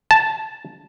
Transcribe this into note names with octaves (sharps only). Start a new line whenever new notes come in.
A5